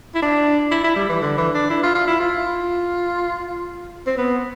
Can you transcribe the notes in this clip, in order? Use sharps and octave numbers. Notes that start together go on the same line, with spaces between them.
E4
D4
E4
E4
G3
E3
D3
E3
D4
E4
F4
F4
E4
F4
C4
B3